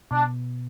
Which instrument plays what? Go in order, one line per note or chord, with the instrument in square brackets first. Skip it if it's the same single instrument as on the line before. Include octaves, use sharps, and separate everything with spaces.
[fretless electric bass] B2 [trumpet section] D4